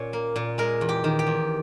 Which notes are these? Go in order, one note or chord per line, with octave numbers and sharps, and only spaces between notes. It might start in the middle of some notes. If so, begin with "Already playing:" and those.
Already playing: A#2 C#4 C#5
A#3
A#2
G#3 A#4
E2
G4
D#3
G4
E2